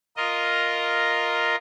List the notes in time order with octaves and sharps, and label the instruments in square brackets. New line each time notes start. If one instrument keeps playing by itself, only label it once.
[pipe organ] F4 A#4 D#5